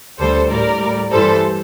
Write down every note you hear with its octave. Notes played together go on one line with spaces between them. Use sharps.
D2 D3 G3 A4 C5
A2 G3 A#4 D5
A2 G3
G2 E3 G3 A4 C5